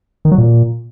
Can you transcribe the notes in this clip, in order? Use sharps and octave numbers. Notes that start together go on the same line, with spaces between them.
D#3
F#3
A#2